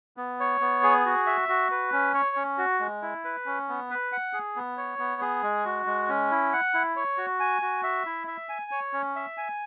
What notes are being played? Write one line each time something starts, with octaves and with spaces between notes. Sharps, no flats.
B3
C#5
B3
G#4
F#4
E5
F#4
B4
C#4
C#5
C#4
F#4
G#3
E4
B4
C#4
B3
B4
F#5
G#4
B3
C#5
B3
G#4
G#3
F#4
G#3
C#4
E4
F#5
E4
C#5
F#4
G#5
F#4
E5
E4
E5
G#5
C#5
C#4
E5
G#5